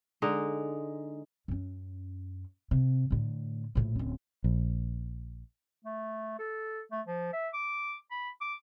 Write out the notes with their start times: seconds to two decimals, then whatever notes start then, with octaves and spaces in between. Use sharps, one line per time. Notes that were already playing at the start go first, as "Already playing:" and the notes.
0.22 D3 G#3 D#4
1.48 F#2 C#4
2.71 C3
3.11 A2 D3
3.75 A#1 A2
3.95 D1 C#4
4.44 A#1
5.85 A3
6.39 A4
6.91 A3
7.06 F3
7.33 E5
7.54 D6
8.11 B5
8.41 D6